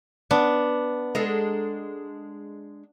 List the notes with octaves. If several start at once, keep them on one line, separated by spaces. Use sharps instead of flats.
B3 D4
G#3 D4 A4 A#5